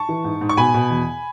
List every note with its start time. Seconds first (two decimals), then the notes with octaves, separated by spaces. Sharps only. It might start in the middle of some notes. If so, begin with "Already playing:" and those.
Already playing: A5 C#6
0.09 E3
0.24 G#2
0.41 G#2
0.49 C#6
0.57 B2 G#5 B5
0.74 B2
0.90 E2